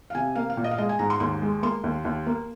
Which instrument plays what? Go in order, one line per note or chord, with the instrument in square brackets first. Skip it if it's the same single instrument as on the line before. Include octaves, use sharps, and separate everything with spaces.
[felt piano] F5
C3 G#5
A#3 F5
F5
A#2
D#5
F5
G#3 D#5
G#5
G#2 A#5
C6
D#2 C6
G#3
A#3 C6
D#2
D#2
A#3